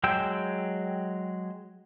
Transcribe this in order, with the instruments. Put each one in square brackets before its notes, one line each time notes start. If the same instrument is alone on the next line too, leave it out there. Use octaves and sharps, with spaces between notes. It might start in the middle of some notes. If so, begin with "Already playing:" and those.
[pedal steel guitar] F#3 G#3 G5 E6 G6